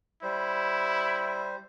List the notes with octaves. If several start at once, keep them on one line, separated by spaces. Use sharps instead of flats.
G3 E4 C5